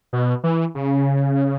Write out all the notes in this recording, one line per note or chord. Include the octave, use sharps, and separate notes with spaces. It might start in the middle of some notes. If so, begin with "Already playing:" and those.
B2
E3
C#3